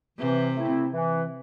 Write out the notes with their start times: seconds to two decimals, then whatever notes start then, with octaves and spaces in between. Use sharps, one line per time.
0.18 C3 E3
0.55 A3 C4 E4
0.93 E3